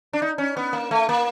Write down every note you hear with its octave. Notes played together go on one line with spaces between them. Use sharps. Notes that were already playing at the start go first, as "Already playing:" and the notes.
D4
D#4
C#4
B3
A#3
A3
A#3